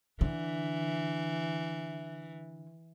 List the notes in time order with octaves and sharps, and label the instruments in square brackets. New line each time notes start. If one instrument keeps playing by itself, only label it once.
[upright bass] D3 [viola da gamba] E3